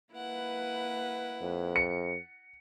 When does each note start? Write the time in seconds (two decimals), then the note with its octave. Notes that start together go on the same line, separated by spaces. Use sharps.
0.13 A#3 E4 B4 F#5
1.42 F2
1.76 C#7